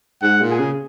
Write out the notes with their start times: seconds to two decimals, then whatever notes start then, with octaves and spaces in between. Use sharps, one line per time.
0.22 G#2 F#5
0.41 A#2
0.51 G#4
0.60 C#3